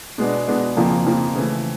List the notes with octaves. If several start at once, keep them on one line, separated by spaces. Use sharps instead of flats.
B2 G#3 B3 D4
B2 G#3 B3 D4
F2 C#3 F3 A#3
F2 C#3 F3 A#3
C#3 E3 A3